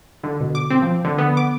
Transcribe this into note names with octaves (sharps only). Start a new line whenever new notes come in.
D3
B2
D6
C4
F3
D3
B3
D6